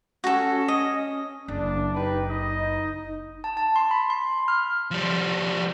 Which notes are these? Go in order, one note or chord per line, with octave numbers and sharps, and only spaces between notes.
C#4 F#4 A4
D#5
F#1 D4
D#4 G4 B4
D#5
A5
A5
C6
B5
C6
F6
F3 G3